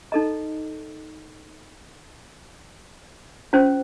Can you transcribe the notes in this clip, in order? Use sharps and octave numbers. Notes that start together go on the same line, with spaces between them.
D#4 A4 D#5 A#5
C#4 F4 C5